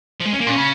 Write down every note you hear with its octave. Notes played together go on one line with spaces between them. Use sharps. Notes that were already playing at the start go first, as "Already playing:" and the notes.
F3
G#3
C#4
A#3
A#2 C#4
C#3